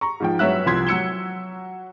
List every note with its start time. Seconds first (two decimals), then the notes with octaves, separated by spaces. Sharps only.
0.01 A#5 C#6
0.20 G#2 F3 G5
0.39 G2 F#3 C#5 E5 F#6
0.66 C2 F3 C6 G#6 B6
0.87 F#3 E6 C#7 E7 G7